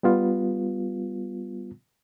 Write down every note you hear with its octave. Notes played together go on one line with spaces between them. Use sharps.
G3 B3 F4